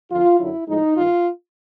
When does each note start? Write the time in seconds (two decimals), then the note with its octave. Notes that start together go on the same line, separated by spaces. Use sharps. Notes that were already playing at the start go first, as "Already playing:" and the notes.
0.10 F2 D3 F3 F4
0.39 F#2 D3 F#3 E4
0.67 A2 F3 G#3 D#4
0.96 G2 D#3 F4